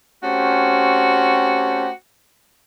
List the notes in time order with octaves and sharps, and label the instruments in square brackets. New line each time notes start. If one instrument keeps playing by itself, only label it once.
[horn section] A3 C4 C#4 F#4 G4